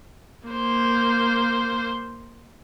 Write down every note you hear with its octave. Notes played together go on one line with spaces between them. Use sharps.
A#3 C5